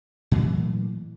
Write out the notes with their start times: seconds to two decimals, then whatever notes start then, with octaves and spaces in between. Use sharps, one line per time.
0.31 A#2 E3 F#3 A3